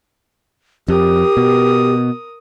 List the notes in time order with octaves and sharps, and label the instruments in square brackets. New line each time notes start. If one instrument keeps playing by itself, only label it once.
[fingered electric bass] F2 [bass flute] G4 [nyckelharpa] A#4 D#6
[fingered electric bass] B2